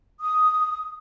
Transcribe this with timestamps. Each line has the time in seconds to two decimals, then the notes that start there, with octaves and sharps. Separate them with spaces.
0.20 D#6